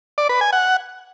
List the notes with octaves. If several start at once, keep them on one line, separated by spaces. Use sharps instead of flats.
D5
B4
G#5
F#5